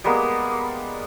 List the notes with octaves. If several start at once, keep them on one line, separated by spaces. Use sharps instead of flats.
G3 G#3 A#3 B3